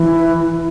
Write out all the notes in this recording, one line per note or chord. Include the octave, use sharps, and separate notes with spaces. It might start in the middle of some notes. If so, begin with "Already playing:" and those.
Already playing: E3